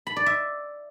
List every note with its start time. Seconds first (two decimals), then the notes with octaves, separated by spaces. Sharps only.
0.07 B5
0.16 D5
0.26 E5